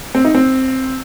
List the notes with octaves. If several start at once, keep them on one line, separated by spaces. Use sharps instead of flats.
C4
D#4
C4